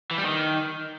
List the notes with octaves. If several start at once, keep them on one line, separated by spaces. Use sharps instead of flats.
E3
G3
D#3